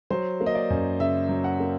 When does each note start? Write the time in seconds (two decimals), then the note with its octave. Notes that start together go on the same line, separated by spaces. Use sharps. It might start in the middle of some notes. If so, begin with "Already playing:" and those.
0.10 F#3 C5
0.40 A#3
0.46 D#5
0.55 D5
0.70 F#2
0.99 C#3 E5
1.29 F#3
1.44 F#5
1.60 A#3